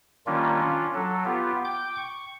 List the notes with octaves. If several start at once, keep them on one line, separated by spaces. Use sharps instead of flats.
D#3 G3 A#3 C#4 D4 F4
C#4 D4 F4
F#3 A4
B3 F4 G4
G5 D6 G6
C#6